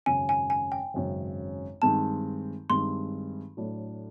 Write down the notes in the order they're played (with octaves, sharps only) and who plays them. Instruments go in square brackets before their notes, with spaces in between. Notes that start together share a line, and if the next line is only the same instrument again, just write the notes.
[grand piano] G#1 F#2 C#3 [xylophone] G#5
[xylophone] G#5
G#5
G5
[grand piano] G#1 F#2 C#3
[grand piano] G2 D#3 G#3 C4 [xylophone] A5
[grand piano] G2 D#3 G#3 C4 [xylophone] C6
[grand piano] A2 F#3 A3 D4